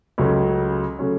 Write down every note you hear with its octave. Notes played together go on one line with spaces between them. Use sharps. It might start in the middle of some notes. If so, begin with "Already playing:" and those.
C#2 C#3 F#3 A3 C#4
C#3 F#3 A3 C#4